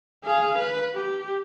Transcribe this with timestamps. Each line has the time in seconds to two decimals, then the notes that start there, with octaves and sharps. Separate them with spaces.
0.25 G#4 F5
0.59 B4
0.95 G4